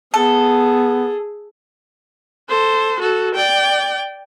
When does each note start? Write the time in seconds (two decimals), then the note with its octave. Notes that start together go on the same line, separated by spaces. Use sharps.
0.14 B3 G#4 A4
2.49 A4 C5
3.00 F#4 A4
3.35 D5 G5